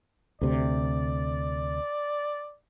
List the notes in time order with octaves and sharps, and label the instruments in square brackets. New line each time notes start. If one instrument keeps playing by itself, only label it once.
[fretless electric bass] D2 C3 [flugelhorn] D5